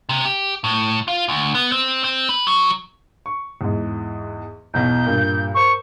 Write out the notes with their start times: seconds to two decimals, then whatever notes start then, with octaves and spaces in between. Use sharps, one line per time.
0.09 C3
0.25 G4
0.64 A2
1.08 F4
1.29 D2
1.55 B3
1.72 C4
2.04 C4
2.29 B4
2.46 F#3
3.26 C#6
3.61 E2 G#2
4.74 B1 E2 B2 G6
5.06 G2 A#2
5.55 A#4 C5 C#6